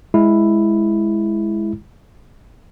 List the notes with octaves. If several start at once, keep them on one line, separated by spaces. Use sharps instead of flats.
G#3 E4